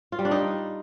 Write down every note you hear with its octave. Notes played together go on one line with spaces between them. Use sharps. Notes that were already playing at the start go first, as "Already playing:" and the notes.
F4
G3
D4
D#4